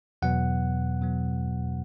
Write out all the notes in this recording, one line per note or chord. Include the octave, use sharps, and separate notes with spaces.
E2 B2 F#3 B3 F#5
B2 F#3 B3